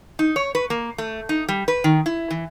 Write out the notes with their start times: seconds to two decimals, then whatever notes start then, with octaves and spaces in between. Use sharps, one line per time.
0.19 D#4
0.36 C#5
0.55 B4
0.70 A#3
0.98 A3
1.29 D#4
1.49 G3
1.68 B4
1.84 D#3
2.06 E4
2.31 E3